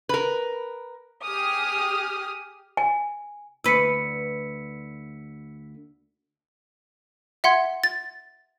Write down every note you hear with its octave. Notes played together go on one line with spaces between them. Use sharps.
A#4 B4
G4 G#4 D#6 F6
G#5
D2 B4 E6 B6 C#7
E5 F#5 C6 G#6
A6